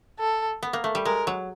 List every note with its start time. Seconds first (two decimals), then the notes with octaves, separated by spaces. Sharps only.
0.20 A4
0.63 B3
0.73 A#3
0.84 A3
0.95 G3
1.05 G#3 A#4
1.27 F#3